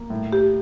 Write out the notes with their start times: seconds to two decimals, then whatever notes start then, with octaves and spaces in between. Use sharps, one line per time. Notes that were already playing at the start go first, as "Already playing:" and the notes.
Already playing: A#3
0.10 A2
0.33 G4